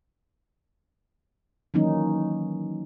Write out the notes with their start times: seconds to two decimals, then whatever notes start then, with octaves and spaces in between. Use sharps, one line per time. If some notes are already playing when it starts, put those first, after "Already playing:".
1.74 D#3 E3 F#3 A#3 C#4 D#4